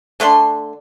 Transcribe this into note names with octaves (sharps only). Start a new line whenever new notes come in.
D3 A3 D4 C6